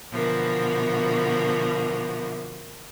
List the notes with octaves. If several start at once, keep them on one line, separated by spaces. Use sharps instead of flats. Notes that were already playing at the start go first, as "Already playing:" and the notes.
B2 D3 E3 F3 A#3 F#4